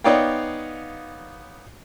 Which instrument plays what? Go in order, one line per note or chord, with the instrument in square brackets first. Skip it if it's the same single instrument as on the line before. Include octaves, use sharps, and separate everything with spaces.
[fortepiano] B3 D#4 C#5 D5 F5 G5